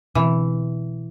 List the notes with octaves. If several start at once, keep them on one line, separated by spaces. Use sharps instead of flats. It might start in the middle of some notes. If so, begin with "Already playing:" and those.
B2 D3 E3 C4